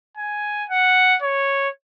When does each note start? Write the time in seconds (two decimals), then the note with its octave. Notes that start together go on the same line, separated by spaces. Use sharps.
0.17 G#5
0.69 F#5
1.22 C#5